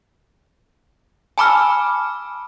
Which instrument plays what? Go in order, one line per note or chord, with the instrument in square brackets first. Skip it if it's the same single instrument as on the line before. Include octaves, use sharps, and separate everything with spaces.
[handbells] G#5 A5 B5 D6 E6 F6